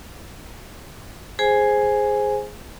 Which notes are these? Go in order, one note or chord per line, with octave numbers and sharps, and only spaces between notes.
G#4 C5 G#5